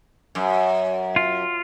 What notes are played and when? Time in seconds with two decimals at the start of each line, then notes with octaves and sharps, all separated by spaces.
0.35 F#2
1.16 F4